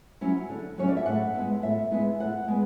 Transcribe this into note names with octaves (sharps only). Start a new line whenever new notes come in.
F#3 C#4 E4
D3
F#3 C#4 E4 C#5
D5
E5
A2 F#5
G#3 B3 E4
A2 E5
G#3 B3 E4
A2 F#5
G#3 B3